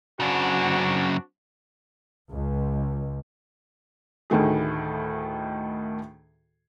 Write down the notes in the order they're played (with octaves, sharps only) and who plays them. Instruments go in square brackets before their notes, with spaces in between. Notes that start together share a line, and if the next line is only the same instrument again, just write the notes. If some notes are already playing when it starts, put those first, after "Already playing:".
[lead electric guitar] F#2 C#3 [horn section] C4 D4 F#4
[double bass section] C#2
[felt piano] D2 A2 D#3 A3 G#4